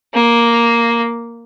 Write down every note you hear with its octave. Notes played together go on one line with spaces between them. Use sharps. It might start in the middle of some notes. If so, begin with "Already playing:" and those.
A#3